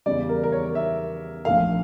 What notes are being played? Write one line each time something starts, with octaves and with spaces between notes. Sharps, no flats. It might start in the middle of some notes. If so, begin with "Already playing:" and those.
E2 C#3 G3 D5
A#4
A#4
C#5
E5
A#1 A#2 A3 F5